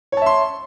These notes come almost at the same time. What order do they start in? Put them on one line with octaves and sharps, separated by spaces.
C#5 A5 E5 C6